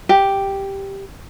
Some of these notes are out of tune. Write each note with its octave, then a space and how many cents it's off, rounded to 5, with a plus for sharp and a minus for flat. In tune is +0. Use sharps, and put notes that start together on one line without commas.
G4 +0